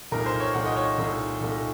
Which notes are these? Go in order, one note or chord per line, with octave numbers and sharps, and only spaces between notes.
C2 A#2 A3 D#4 A#4
C5
C#5
C2 A#2 A3 D#4 F#5
D#5
C#5
C2 A#2 A3 D#4
C2 A#2 A3 D#4